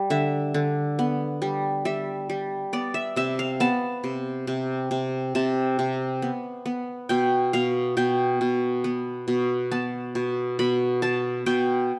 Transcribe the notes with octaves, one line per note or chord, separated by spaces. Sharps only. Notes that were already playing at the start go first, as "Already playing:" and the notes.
Already playing: G3
D3 E5
D3
B3
G3
G3 E5
G3
B3 D5
E5
C3 E5
F5
B3 A5
C3
C3
C3
C3 A5
C3
B3
B3
B2 G5
B2 F5
B2 G5
B2
B3
B2
B3 A5
B2
B2 B5
B2 A5
B2 G5